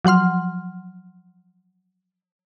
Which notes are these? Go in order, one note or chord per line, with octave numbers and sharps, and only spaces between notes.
F3 F#3 F#5 C6 F6